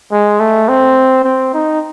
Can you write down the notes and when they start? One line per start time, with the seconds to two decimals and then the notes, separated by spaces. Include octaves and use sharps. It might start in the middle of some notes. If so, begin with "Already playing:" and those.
0.12 G#3
0.40 A3
0.68 C4
1.24 C4
1.54 D#4